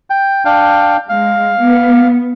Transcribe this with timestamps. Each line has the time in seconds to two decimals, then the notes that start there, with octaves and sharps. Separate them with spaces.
0.10 G5
0.45 D4 F5 G5
1.09 G#3 F5
1.63 B3